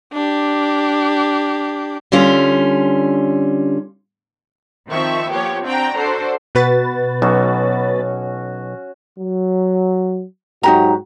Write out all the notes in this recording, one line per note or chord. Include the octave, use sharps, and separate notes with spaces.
D4 G4
D3 G3 C#4 F4
D#3 F3 C4 E5 C#6
F3 A#3 B3 G4 C#5
C4 D4 F#4 G5 A#5
D4 F#4 A4 C5
B2 F#4 B4 A6
B1 C#4 F#4 C#5
F#3
G#2 F#3 D#4 F#4 G4 A#5